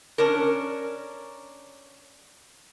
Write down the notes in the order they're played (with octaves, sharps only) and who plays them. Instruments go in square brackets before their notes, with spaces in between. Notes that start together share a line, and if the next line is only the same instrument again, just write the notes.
[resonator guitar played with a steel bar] C#4 D4 A#4